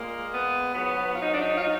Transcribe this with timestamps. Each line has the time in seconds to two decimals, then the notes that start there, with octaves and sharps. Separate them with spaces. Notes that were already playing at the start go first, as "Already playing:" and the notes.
Already playing: A#2 G#3 A#3
0.33 B3
0.73 G#2 F#3 B3
1.13 F4
1.22 D#4
1.32 D4
1.40 D#4
1.54 F4
1.64 D#4